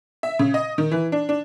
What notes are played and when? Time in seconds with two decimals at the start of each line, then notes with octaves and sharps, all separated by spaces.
0.23 E5
0.39 C#3
0.54 D#5
0.78 D#3
0.91 E3
1.12 D4
1.29 D4